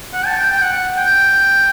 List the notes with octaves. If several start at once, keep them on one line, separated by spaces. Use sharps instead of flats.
F#5
A5
G5
G5
F#5
G5